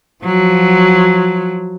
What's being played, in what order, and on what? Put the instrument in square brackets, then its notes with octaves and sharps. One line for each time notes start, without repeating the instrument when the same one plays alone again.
[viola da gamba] F3 F#3